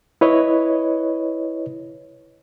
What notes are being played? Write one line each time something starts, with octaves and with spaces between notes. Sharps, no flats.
E4 B4 C#5 D#5